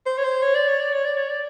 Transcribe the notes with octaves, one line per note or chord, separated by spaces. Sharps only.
C5
C#5
C5
C#5
D5
C#5
D5
C#5
D5
C#5
D5